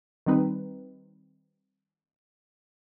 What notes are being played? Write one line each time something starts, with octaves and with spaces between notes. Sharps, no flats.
D#3 G3 C4 D#4 B4